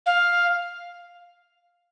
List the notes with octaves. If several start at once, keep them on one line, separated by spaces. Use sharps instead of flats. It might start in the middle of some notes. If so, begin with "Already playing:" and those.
F5